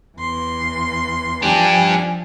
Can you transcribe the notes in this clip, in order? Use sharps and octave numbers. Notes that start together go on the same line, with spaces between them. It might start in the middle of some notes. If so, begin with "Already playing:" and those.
E2 C6
F3 D4 G4 G#5